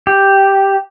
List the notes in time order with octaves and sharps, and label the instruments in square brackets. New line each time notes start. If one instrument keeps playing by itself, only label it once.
[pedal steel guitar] G4